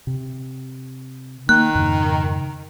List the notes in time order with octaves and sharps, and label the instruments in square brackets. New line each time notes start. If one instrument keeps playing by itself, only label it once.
[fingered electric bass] C3
[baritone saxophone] D#3 [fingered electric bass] A#3 [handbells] F#6
[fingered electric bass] F2 G#2 C#3